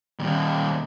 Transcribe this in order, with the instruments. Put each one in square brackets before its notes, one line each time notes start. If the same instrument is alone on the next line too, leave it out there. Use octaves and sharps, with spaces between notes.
[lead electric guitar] D#2 A#2